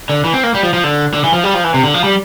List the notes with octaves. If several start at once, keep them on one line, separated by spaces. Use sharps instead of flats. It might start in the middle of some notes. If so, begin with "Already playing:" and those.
D3
E3
C4
A#3
G3
F3
F3
D3
D3
E3
F3
G3
F3
E3
C3
D3
F3
G3